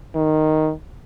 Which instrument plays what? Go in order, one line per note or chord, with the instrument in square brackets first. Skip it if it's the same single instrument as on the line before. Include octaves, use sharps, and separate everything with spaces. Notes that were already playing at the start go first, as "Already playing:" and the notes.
[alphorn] D#3